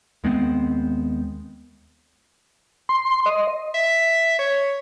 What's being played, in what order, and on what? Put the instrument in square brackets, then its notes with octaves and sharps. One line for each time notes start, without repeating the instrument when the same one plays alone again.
[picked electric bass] D#2 G#3 B3 C4
[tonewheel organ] C6
D#5
[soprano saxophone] E5
C#5